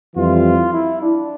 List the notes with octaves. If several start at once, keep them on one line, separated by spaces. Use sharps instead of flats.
F2 E3 G3 F4
E4
D4